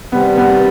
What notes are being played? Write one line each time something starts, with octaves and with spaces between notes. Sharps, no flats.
C3 D#3 G3 B3
B3